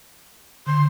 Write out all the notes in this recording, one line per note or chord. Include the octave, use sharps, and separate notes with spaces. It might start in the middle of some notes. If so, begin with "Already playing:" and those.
D3 C6